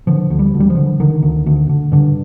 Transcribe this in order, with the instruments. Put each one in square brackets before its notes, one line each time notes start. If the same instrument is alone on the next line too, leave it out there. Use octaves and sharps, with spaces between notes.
[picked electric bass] D3 F3
D2
G3
D2
G3
F3
D3
D3 D#3
D2
D2
D3
G2 D3